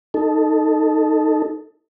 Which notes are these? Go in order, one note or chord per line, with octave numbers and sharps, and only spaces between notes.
D#4 A4